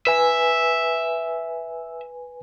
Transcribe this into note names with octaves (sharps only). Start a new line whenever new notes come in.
B4 E5 G#5